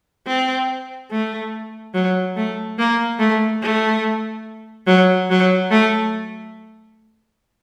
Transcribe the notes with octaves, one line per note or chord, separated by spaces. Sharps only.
C4
A3
F#3
A3
A#3
A3
A3
F#3
F#3
A3